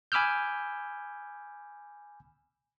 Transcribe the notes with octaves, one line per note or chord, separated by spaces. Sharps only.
G#5 B5 D6 E6 F6 G6